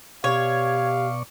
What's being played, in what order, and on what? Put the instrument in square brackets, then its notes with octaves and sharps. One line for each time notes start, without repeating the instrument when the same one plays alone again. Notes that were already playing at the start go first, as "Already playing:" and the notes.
[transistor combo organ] B2 D5 C#6 [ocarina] G4 [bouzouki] C#5 [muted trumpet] F5